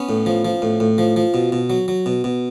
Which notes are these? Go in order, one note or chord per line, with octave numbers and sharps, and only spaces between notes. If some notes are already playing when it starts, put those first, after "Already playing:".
Already playing: B3 C#4
A2
F3
F3
A2
A2
F3
F3
B2
B2
F#3
F#3
B2
B2